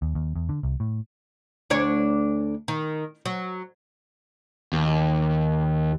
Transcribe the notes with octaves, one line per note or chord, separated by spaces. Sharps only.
D#2
D#2
E2
D3
C2
A2
D2 D4 C#5
D#3
F#3
D#2